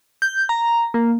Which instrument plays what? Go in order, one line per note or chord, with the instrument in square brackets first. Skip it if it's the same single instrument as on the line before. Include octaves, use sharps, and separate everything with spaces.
[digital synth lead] G6
A#5
A#3